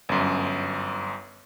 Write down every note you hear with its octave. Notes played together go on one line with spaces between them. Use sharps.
G1 F#2